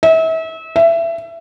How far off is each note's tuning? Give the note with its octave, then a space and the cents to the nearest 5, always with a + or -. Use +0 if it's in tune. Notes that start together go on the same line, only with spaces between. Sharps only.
E5 -35
E5 +20